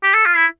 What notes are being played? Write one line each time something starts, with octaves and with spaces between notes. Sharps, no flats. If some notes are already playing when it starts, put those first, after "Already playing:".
G4
A4
F4
E4